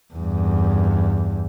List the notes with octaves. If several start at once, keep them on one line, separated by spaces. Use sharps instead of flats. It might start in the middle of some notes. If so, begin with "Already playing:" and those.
E2 G2